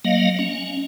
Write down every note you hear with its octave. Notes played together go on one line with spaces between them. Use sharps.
F#3 A#3 D#5 F5
C#4